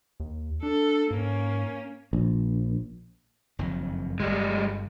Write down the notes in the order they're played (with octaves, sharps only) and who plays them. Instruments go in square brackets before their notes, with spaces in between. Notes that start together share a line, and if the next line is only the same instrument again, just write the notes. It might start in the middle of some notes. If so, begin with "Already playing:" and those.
[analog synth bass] D#2
[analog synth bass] D4 [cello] A4
[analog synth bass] G#2 [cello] A#3 C#4
[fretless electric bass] A#1
[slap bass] F#1 F2 D#3
[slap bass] G1 [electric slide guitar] G3 G#3